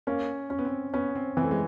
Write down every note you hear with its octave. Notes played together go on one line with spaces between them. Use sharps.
A#3 C#4
C#4
B3
C4
B3 C#4
C4
E3 C4
A3
G#3